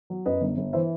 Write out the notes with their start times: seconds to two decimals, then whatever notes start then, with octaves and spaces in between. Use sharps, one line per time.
0.10 F#3
0.26 F#2 B4 D#5
0.41 G1
0.58 G1
0.73 E3 C5 E5